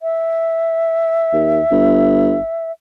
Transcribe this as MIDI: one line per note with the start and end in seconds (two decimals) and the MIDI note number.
0.02 2.72 76
1.33 1.59 39
1.71 2.38 31